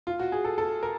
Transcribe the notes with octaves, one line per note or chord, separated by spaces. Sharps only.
F4
F#4
G#4
A4
A4
A#4